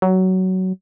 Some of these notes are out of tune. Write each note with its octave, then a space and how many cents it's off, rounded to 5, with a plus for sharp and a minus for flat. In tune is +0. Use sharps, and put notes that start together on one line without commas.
F#3 +15